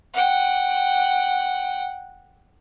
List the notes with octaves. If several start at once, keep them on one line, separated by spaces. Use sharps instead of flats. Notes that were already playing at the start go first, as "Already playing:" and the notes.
F#5 G5